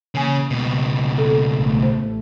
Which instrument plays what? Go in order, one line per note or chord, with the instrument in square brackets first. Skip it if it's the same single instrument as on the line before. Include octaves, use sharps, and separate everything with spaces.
[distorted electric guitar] C#3 [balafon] E3 A#3 G#5
[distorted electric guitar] C#2 B2
[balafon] A4
[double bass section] A1 A3
[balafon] C5